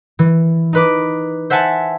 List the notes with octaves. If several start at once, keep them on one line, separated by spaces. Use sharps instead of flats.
E3
D#4 B4 D6
C5 E5 F#5 G#5 A5